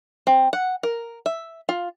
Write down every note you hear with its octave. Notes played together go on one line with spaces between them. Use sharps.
C4
F#5
A#4
E5
F4